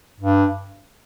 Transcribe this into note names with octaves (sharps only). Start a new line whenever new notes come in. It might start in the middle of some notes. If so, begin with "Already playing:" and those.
G2